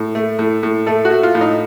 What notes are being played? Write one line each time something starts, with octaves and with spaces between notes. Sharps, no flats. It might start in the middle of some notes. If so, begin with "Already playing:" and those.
Already playing: A2
A3
A2
A2
A3 A4
F#4
A3
F4
A2
D#4